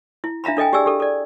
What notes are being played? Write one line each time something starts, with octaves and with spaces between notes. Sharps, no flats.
E4
D4 E5 F5 A#5 B5
D4 A4 D#5 G5 G#5
G4 G#4 D5 G#5 E6
G4 A4
A4 D5